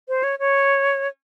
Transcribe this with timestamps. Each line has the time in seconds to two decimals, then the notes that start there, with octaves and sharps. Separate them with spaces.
0.09 C5
0.23 C#5
0.39 C#5